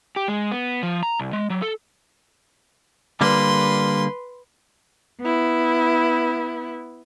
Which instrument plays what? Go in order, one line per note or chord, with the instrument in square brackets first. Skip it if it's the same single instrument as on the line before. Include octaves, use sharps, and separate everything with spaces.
[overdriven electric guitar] G4
G#3
B3
F3
A#5
C2
G#3
F#3
A4
[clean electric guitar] D3 G3 A#3 [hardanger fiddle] B4 C6
[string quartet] B3 E4